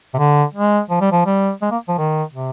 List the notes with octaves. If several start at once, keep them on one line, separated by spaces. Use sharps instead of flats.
C3
D3
G#3
F3
G3
F3
G3
G#3
A#3
F3
D#3
C3